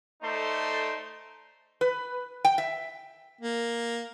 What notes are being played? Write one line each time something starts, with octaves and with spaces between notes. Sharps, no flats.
A3 D#4 A4 C5 D5 C6
B4
G5
E5
A#3